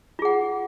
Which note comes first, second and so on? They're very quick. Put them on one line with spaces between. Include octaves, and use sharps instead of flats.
F4 G#4 F#5